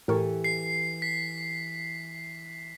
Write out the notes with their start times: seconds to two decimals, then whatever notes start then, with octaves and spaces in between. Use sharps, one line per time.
0.08 A2 E3 G4 A4 A#4 C#6
0.44 C7
1.02 B6